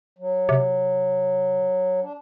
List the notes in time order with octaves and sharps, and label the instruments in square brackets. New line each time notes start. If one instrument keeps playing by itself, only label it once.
[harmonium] F#3
[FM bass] C3
[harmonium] D4